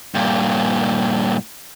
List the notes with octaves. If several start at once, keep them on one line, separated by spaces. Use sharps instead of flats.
G2 A#2